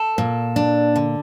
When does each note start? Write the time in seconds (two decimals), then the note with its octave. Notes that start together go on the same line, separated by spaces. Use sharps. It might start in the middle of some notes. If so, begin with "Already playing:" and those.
Already playing: A4
0.18 A#2
0.56 D4
0.96 D3